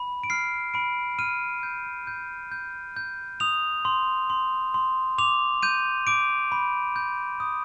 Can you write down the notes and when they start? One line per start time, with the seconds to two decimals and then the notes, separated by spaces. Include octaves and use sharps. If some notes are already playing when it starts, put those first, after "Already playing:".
Already playing: B5
0.24 D7
0.30 F6 C7
0.74 B5 D7
1.19 F6 D#7
1.63 G6
2.07 G6
2.52 G6
2.96 G6
3.40 D#6 F7
3.85 C6
4.30 C6
4.74 C6
5.18 D6 F7
5.62 G6 D#7
6.07 D6 D7
6.52 B5
6.96 G6
7.40 D#6